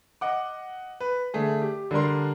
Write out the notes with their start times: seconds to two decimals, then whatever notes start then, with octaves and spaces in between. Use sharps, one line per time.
0.21 D#5 F#5 D6
1.00 B4
1.34 D3 A3 G#4
1.62 G4
1.91 D3 G3 D4 A#4 C6